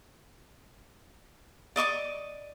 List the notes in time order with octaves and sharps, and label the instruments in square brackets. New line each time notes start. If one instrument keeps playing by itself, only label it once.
[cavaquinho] D5 D#5 C#6 D6